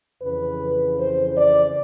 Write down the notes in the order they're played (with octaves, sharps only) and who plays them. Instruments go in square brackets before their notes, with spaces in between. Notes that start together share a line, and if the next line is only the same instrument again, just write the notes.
[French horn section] F2 C#3 E3 B4
C5
D5